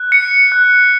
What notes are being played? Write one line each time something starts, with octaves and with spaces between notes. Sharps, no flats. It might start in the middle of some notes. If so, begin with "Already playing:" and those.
Already playing: F#6
C#7
F#6